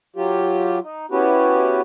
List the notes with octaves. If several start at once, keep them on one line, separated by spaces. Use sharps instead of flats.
F#3 F4 G4
D#4
B3 C#4 E4 F#4 G4 B4